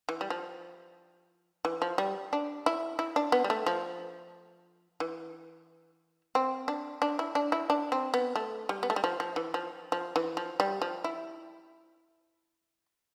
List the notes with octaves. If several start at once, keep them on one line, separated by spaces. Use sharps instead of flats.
E3
G3
F3
E3
F3
G3
D4
E4
E4
D4
B3
G3
A3
F3
E3
C4
D4
D4
E4
D4
E4
D4
C4
B3
A3
G3
B3
A3
G3
F3
F3
E3
F3
F3
E3
F3
G3
F3
E4